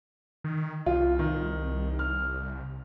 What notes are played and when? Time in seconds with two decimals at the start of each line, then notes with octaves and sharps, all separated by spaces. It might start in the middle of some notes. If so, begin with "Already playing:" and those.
0.44 D#3
0.86 C2 F4
1.19 D#3
1.99 F6